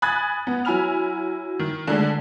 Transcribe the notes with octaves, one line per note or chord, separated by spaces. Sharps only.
G#5 B5 D#6 F#6 G#6 A6
B3
F#3 E4 G#5 B5 F6 F7
D#3
D3 G#3 A3 D4